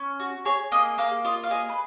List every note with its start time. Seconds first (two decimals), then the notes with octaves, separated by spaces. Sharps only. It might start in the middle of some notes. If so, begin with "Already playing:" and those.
Already playing: C#4
0.20 F#4
0.45 G#4 C#5
0.72 A#3 D#5
0.98 A#3 F5
1.25 F4 D#5
1.43 F5
1.50 G#4 D#5
1.69 B4